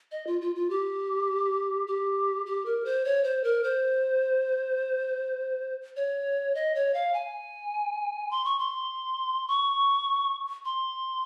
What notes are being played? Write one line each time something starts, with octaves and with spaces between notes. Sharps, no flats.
D#5
F4
F4
F4
G4
G4
G4
A#4
C5
C#5
C5
A#4
C5
C#5
D#5
C#5
F5
G#5
C6
C#6
C6
C#6
C6